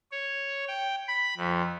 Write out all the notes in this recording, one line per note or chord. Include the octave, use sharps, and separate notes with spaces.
C#5
G5
B5
F2